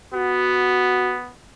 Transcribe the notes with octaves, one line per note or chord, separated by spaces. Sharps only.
B3 F#4